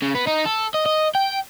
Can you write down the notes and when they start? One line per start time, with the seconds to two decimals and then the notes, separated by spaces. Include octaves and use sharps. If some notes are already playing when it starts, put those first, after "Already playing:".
0.02 C#3
0.15 B3
0.27 D#4
0.45 A4
0.74 D#5
0.86 D#5
1.15 G5